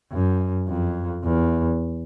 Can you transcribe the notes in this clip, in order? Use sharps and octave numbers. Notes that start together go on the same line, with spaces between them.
F#2
F2
E2